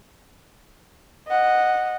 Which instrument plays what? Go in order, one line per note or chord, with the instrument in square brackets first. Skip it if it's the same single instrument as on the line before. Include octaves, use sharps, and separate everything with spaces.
[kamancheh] D#5 F#5